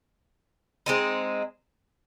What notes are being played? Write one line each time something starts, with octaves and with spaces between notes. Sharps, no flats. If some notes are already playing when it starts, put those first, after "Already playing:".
G#3 C4 D#4